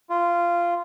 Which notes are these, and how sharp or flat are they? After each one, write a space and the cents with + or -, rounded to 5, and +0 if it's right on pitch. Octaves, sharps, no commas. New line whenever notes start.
F4 -15